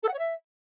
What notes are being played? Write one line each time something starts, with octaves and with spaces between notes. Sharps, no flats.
A4
F#5
C#5
E5